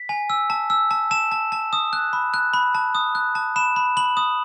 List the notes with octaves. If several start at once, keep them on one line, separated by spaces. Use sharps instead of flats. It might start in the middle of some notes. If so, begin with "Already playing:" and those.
Already playing: B6
G#5
E6
A5
E6
A5
A5 E7
A5
A5
D#6
F#6
B5
F#6
B5
A5
D#6
F#6
A5
B5 E7
B5
B5 F#7
D#6